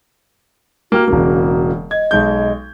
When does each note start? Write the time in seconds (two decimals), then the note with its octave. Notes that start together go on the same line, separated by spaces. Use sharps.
0.92 A#3 F#4 G4 F6
1.08 E1 C#3 A#3
1.91 D#5 G#6
2.11 B1 G#3 G6